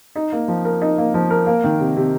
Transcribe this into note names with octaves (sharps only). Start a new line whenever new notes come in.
D#4
A#3
F3
A#4
D#4
A#3
F3
A#4
A#3
D#3
C3
C3